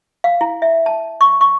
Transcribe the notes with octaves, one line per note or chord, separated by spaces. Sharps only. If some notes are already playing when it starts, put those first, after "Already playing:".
F5
E4
E5
A5
C#6
C#6